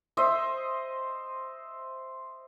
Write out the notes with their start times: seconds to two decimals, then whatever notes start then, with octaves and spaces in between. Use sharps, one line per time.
0.17 C5 D#5 E5